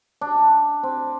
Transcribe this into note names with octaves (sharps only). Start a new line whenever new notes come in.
D4
C4